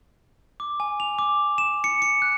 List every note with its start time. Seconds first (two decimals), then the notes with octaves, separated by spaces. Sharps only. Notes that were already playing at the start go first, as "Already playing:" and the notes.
0.60 D6
0.80 G#5
1.00 F7
1.19 D6
1.58 E7
1.84 C#7
2.02 C#7
2.22 F#6